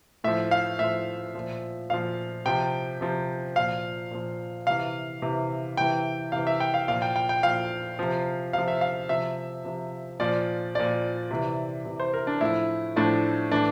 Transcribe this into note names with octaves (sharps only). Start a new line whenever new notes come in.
A2 F3 E5
F5
A2 F3 E5
A#2 F3
A#2 F3 F5
C3 F3 G5
C3 F3
A#2 F3 F5
A#2 F3
C3 E3 F5
C3 E3
C3 E3 G5
C3 E3 F5
E5
G5
F5
A#2 F3 F5
G5
G5
G5
A#2 F3 F5
C3 F3
C3 F3 F5
E5
F5
C3 F3 E5
C3 F3
A#2 F3 D5
A#2 F3 D5
C3 E3
C3 E3
C5
A#4
D4
A2 F3 E4
A2 F3 D4
A2 E3 D4